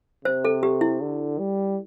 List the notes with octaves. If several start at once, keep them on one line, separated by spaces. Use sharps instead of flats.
C3 C5
A4
G4
E4
D3
G3